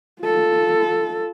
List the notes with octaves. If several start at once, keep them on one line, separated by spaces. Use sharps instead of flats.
F4 A4